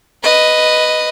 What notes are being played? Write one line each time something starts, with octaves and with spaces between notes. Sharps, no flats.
B4 D#5